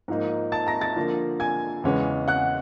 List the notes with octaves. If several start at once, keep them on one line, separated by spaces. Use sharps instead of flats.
G#2 F3 A#3 D#4
A5 A6
A#5 A#6
A5 A6
D3 F3 A#3
G#5 G#6
E2 C#3 E3 G#3 C#4
F#5 F#6